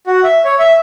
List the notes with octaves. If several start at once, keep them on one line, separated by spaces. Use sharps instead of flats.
F#4
E5
C#5
E5